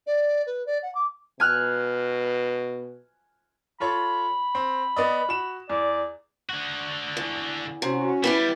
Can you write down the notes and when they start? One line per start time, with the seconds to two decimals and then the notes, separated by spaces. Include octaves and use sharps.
0.06 D5
0.46 B4
0.66 D5
0.82 F#5
0.94 D6
1.40 B2 G#5 F6 F#6
3.80 F4 A4 C#5 B5
4.55 C4
4.96 B3 D5 D#5
5.29 F#4 E7
5.69 E2 D5
6.49 D3 F#4
7.17 E2
7.82 C3 C#4 F#4
8.24 G3 B3 E4 G4